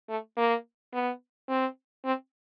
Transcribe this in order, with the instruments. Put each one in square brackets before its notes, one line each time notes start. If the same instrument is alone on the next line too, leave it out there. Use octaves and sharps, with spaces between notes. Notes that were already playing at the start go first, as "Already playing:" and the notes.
[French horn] A3
A#3
B3
C4
C4